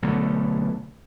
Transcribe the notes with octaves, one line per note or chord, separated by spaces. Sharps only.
B1 D3 A3